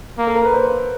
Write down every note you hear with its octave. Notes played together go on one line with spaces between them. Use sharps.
A#3
A4
A#4
B4
C5